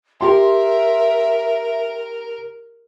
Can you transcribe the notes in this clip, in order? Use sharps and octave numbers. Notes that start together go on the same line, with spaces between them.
G4 A#4 E5 C6